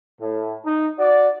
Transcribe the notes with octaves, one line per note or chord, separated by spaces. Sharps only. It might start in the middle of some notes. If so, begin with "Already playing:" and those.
A2
D#4
F#4 D5